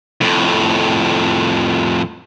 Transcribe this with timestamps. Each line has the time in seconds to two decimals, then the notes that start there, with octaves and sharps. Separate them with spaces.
0.21 F2 A2